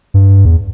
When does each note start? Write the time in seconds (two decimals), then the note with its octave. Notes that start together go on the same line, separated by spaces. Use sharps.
0.14 G2
0.45 E2